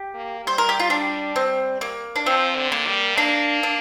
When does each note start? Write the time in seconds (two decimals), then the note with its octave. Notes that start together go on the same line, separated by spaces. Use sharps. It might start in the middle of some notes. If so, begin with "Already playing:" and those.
Already playing: G4
0.15 A#3
0.45 G3 C5
0.58 A#4
0.69 G4
0.80 F4
0.90 D4
1.36 C4
1.81 A#3
2.16 D4
2.26 F3 C4
2.57 D3
2.72 A#3
2.87 G3
3.17 A#3 D4
3.63 D4